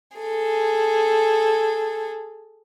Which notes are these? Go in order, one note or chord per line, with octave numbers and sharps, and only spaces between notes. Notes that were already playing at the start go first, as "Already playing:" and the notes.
G#4 A4